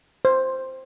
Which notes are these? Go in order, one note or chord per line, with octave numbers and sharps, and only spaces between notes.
C5